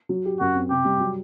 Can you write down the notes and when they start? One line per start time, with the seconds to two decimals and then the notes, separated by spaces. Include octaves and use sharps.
0.09 F#3
0.25 G4
0.40 F#2 F#4
0.55 C4
0.70 C3 G4
0.85 G3
1.00 F#3